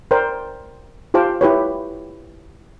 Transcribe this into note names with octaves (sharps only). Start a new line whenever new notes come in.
A#4 C5 D5 G5
F4 G4 C5 F5 A5 D6
E4 G4 B4 C#5